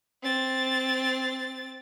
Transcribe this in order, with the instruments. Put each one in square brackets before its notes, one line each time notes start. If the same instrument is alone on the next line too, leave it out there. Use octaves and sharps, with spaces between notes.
[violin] C4 A6